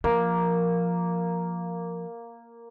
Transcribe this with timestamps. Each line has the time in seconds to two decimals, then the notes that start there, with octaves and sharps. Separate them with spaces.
0.04 F3 A#3